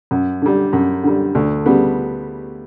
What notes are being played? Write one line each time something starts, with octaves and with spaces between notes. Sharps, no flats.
F#2
D3 G3
F#2
D3 G3
D2
C#3 G3 B3